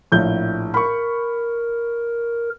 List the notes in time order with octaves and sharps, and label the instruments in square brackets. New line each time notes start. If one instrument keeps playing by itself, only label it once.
[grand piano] A#1 A2 G6
[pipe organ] A#4 [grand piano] B5 C#6